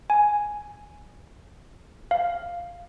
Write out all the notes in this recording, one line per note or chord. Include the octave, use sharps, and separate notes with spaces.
G#5
F5